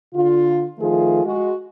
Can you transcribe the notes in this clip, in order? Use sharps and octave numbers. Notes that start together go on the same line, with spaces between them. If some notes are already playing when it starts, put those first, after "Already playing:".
D3 F4
D#3 F3 A3 F4 G#4
G#3 F#4